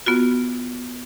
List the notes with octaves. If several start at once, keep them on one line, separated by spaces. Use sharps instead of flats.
B3 F4 F#4